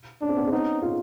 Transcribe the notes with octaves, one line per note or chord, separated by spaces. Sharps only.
C#4 D4
C4
B3 C#4
C4
B3 C#4 D#4
D#4 F4